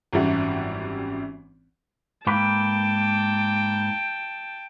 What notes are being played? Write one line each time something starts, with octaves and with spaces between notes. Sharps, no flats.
G#1 F#2 E3 G3 F#5
G#2 A#3 B4 G5 A5